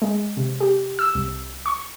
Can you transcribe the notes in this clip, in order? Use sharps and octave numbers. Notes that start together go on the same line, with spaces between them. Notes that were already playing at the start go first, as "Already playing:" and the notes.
G#3
C3
G4
E6
C2
C#6